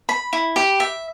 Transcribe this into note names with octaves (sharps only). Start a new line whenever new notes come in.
B5
E4
G4
E5